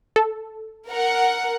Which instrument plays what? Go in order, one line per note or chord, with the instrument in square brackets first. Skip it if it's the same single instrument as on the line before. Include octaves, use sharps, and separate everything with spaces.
[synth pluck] A4
[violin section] A#4 F#5